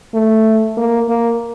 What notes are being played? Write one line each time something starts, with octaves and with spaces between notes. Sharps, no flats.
A3
A#3
A#3